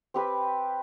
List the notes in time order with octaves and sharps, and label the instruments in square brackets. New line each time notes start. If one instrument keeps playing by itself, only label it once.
[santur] C4 G4 B4